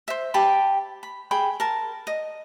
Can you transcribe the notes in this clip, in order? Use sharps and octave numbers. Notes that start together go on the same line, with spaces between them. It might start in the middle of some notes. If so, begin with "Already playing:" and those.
C5 E5
G4 G5 A5 B5
B5
G#4 G5 B5
A#4 A5
D#5